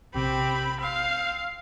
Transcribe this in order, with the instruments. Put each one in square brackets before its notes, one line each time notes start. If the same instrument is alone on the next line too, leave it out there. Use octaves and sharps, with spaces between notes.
[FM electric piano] A#1 C3 [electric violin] C4 B5 [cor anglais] G4
[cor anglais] C4 [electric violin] F5